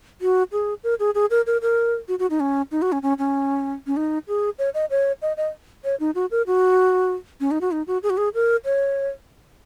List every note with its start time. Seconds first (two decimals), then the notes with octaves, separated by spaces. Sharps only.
0.21 F#4
0.52 G#4
0.84 A#4
1.00 G#4
1.15 G#4
1.31 A#4
1.47 A#4
1.62 A#4
2.08 F#4
2.19 F#4
2.30 D#4
2.40 C#4
2.71 D#4
2.82 F#4
2.92 C#4
3.02 C#4
3.19 C#4
3.87 C#4
3.97 D#4
4.28 G#4
4.59 C#5
4.74 D#5
4.90 C#5
5.22 D#5
5.37 D#5
5.84 C#5
6.00 D#4
6.15 F#4
6.31 A#4
6.47 F#4
7.40 C#4
7.51 D#4
7.61 F#4
7.72 D#4
7.87 F#4
8.03 G#4
8.10 F#4
8.17 G#4
8.34 A#4
8.65 C#5